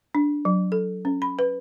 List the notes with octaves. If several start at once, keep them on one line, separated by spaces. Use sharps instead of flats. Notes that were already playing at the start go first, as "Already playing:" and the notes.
D4
F#3
A4
C#4
B5
B4